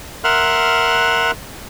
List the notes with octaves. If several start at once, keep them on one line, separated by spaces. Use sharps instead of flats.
A#4 E5 F#5 C6 F6 F#6